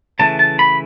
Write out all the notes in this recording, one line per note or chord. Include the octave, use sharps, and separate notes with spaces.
C#3 E3 A3 A5
A5
B5